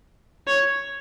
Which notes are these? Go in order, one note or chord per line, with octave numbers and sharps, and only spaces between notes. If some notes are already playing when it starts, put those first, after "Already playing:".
C#5